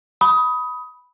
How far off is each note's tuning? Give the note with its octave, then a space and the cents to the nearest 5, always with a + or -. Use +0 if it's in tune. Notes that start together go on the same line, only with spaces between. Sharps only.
B5 +0 D#6 +20